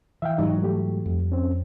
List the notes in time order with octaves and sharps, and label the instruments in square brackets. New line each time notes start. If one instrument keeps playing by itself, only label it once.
[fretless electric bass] E3 [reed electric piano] E5 F5 G5
[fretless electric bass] G#2 E3 F#3 [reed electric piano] G3 D#4
[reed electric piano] G3 A3 G4
[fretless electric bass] F2
[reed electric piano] C4 C#4